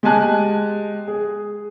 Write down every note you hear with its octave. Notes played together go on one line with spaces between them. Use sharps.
G#3 G4 D#5 G#5 A5 F#6
G#4